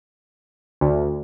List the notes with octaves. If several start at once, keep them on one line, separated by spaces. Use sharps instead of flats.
D2